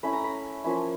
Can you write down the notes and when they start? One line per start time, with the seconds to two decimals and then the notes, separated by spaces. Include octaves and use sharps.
0.03 A3 C#4 E4 B5
0.13 A#5
0.24 B5
0.64 F3 A#3 C#4 E4